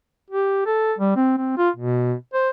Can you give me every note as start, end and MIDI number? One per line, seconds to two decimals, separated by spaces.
0.30 0.61 67
0.66 0.93 69
0.98 1.14 55
1.16 1.36 60
1.38 1.55 60
1.58 1.69 65
1.77 2.14 47
2.34 2.50 72